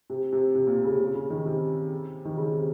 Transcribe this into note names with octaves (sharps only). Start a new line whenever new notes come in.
C3
C3
C3
A#2
C3
C#3
C3
C#3
C#3
D#3
C3
D#3
C#3
C3